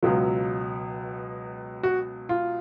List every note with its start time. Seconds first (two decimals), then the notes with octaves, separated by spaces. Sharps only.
0.03 C#2 B2 F#3 F4
1.83 F#4
2.29 F4